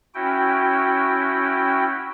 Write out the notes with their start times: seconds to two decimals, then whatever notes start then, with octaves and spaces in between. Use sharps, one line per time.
0.15 C#4 E4 F#4 G5